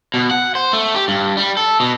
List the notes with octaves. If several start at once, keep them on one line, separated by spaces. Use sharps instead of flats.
B2
F#5
C5
A3
G4
G2
G3
A4
B2